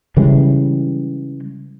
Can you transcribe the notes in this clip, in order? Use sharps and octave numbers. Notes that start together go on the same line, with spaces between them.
C#3 E3 G3 G#3